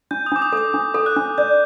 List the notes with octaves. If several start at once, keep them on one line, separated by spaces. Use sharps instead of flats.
D4 G6
D#6
D4 D6
D#6
A4 D6
D4
A4
F#6
D4
D5 G6